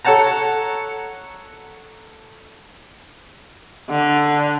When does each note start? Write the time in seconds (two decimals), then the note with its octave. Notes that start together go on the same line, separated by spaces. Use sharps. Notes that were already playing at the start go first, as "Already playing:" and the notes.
0.05 A4 C#5 F#5 A5 A#5
3.90 D3